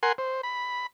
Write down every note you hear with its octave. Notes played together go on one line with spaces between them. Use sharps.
A#4 F#5 G#5 C6
C5
B5